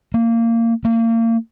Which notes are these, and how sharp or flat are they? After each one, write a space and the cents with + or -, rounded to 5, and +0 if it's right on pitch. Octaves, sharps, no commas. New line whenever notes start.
A#3 -20
A#3 -35